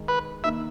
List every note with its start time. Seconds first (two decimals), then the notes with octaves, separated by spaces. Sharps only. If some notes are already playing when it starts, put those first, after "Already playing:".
Already playing: D#3 G#3 D#4
0.08 B4
0.44 D#3 A#3 D#4 E5